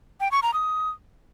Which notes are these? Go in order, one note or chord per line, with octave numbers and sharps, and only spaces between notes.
G5
C#6
A#5
D#6